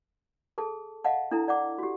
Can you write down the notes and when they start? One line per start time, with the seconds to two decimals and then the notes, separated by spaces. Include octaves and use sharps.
0.58 G#4 A4 A5
1.04 D#5 F5 F#5 A5
1.31 D4 E4 A4 A#5
1.48 D5 F#5 D6
1.78 F#4 G4